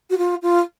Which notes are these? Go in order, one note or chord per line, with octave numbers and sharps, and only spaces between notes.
F#4
F4
F4